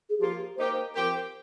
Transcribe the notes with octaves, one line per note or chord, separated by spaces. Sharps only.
G#4
F3 A#3 F4 G4 A#4
A#3 D#4 G4 A#4 C5
F3 C4 G4 A#4